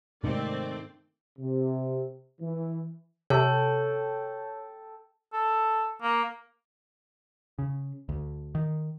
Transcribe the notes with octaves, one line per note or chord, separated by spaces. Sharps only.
G#2 C3 D#3 A3 C4 D5
C3
E3
C3 A4 C#5 G5
A4
A#3
C#3
D2
D#3